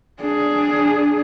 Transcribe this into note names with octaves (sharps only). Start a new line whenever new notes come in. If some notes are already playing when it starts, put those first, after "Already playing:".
D4 G#4